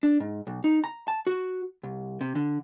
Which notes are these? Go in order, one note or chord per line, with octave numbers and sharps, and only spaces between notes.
D4
G#2
B1
D#4
A#5
A5
F#4
C2
C3
D3